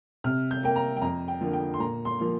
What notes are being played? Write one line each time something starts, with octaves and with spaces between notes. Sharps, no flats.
C3 F6
G6
A#3 G5
A#5
G5
F2 A#5
G5
D3 F3 A#3
G5
C6
A#2 A#5
C6
F3 A#3